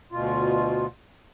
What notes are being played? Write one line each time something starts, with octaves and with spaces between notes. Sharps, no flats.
D2 B2 F4